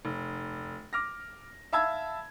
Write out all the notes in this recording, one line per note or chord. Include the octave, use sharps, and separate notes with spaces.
F1
D6 F6 A#6
E5 F5 A5 B5 E6 G#6